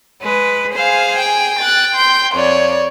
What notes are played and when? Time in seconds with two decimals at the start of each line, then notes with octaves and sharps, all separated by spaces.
0.22 G#3 B4
0.73 G#4 C5 F5 G#5
1.17 G5
1.59 F#6 A6
1.95 C6 G6
2.35 F2 C#5 D5